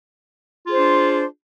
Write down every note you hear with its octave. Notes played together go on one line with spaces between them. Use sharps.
D4 F4 G#4 C5